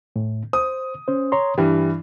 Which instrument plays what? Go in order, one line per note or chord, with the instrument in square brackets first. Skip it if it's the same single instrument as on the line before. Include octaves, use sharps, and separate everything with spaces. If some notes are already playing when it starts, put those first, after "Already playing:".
[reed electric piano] A2
[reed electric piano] C5 [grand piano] D#6
[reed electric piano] C#4 C5
C#5 A#5 C6
[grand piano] G2 E3 [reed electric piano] G4